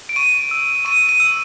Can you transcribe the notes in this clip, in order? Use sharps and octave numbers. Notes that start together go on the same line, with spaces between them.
D7
C#6 D#7
E6
C#6 D#7
D#7
E6